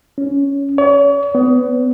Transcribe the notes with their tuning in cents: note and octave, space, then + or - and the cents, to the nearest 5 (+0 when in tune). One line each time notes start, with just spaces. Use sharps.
C#4 +10
C#5 +40
B3 +25